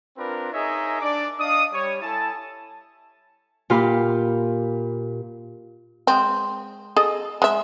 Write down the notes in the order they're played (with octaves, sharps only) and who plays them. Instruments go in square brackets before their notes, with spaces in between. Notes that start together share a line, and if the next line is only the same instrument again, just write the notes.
[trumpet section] C4 D4 F4 A#4 B4
D#4 G#4 A#4 C#5 D#5 E5
D4 D5 D6
D4 D#5 F5 D#6
G3 C#5
E4 A4 G#5 A5
[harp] A#2 F4 G4 F5 B5
[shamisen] G#3 C4
G#4 A4 D#5
G#3 E5